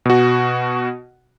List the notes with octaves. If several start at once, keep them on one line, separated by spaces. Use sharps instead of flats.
B2 F#4